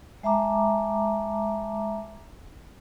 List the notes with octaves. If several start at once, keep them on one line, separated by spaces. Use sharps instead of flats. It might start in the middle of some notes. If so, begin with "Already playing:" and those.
G#3 E5 A5 A#5 D6